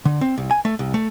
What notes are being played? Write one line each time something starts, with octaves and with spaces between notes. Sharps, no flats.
D3
C4
C2
G#5
A3
C2
A3